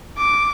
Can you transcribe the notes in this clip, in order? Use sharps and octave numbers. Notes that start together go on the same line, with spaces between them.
D6